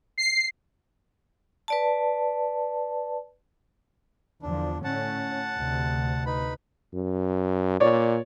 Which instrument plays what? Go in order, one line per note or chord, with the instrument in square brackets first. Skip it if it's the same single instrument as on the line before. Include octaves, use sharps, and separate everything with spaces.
[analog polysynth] C7
[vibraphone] B4 D5 A5
[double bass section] E2 D3 F3 [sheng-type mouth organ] D4
[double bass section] A2 C#4 [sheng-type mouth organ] F#5 A5
[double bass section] D2 C3
[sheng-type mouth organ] D#4 B4 B5
[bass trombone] F#2
[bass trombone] A#2 [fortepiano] C#5 D5